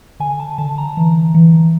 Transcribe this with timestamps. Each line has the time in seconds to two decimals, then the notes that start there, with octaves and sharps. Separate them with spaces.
0.20 D3 G#5
0.40 A5
0.58 D3 A5
0.78 A#5
0.97 E3
1.34 E3